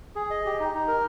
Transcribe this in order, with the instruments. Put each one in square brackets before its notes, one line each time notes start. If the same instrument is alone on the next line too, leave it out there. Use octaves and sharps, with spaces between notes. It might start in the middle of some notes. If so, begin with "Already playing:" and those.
[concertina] G#4
D#5
G4
D#4
D#4
A#4